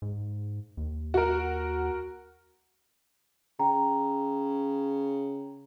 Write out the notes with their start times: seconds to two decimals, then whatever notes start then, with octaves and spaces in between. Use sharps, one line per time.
0.02 G#2
0.77 D#2
1.14 F#4 A#4
3.59 C#3 G5 A#5